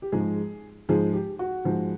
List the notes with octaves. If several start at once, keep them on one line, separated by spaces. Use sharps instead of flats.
G4
G#2 F3 G#3 G#4
G#2 F3 G#3 G#4
G4
F#4
G#2 F3 G#3